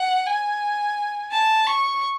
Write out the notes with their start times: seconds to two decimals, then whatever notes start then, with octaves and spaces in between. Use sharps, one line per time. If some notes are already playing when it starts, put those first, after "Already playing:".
Already playing: F#5
0.26 G#5
1.32 A5
1.67 C#6